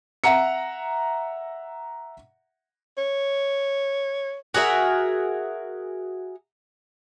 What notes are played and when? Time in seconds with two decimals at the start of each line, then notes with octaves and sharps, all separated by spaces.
0.24 E5 F#5 A#5 C#7
2.98 C#5
4.54 F#4 G#4 A#4 E5